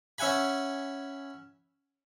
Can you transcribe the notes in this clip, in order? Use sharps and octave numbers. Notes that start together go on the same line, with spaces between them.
C#4 E5 F#5 G#5 B5